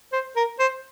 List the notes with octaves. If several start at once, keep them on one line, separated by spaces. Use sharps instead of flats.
C5
A#4
C5